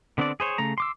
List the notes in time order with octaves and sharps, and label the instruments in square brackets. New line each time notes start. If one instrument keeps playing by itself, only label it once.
[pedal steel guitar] D3 B3 C4 D4 D5
G#4 C5 C#5
C#3 A3 A#5
C6 D6 E6